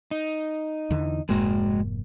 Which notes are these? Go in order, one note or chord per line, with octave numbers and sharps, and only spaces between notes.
D#4
E2 D3 E3
F1 G#2 G#3 A#3 F#4